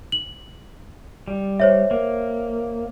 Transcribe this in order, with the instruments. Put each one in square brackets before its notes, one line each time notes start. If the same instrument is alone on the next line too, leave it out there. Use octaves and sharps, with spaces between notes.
[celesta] F#7
[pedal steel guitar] G3
[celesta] C5 C#5 E5
[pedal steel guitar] A#3